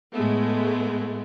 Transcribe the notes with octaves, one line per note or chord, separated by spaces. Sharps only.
A2 G#3 A3 B3